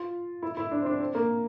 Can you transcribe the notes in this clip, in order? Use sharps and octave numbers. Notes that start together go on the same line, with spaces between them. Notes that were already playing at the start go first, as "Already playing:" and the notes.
Already playing: F4
E4
E4
D4
C4
D4
C4
A#3